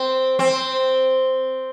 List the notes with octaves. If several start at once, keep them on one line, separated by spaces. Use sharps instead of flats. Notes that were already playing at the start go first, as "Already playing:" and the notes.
Already playing: C4
C4